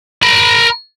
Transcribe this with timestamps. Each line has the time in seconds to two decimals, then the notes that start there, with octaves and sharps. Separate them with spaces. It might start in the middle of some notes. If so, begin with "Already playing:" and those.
0.23 A#4 B5